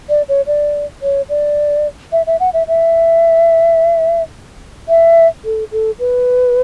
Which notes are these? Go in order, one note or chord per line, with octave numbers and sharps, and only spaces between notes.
D5
C#5
D5
C#5
D5
E5
E5
F#5
E5
E5
E5
A4
A4
B4